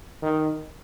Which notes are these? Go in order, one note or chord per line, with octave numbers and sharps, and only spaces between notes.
D#3